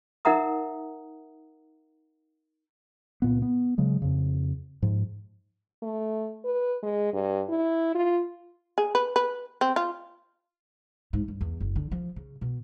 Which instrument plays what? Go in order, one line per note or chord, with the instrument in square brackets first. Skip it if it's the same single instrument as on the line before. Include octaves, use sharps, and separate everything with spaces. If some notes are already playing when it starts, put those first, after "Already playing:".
[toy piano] D#4 A#4 E5 F#5 A#5 D#6
[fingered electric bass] C#2 A#2 B3
B3
C#3 F#3 G#3
F2 C#3
G#2 F3
[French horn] A3
B4
G#3
G2
E4
F4
[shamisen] G#4
B4
B4
C4
F4
[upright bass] G#2
G2
E2
F#1
D3
F3
C#3
B2